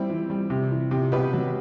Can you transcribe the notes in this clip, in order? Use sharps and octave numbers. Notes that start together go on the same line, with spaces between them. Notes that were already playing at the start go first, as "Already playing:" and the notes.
Already playing: G3 C4 E4
E3
G3
C3
E3
C3
B2 G4 B4
F#3